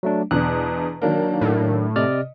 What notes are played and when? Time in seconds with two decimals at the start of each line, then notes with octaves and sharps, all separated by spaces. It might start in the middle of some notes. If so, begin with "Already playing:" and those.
0.03 F#3 A3 D4
0.31 E2 B2 D4 F#6
1.02 D#3 F#3 A#3 D4 A#4
1.41 A2
1.96 C3 D5 D#5 F6